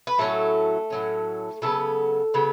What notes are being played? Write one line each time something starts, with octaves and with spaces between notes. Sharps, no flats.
B4
A2 F#3 A3 C#4 A4
A2 F#3 C#4
C#3 F#3 A3 B3 A4
C#3 F#3 B3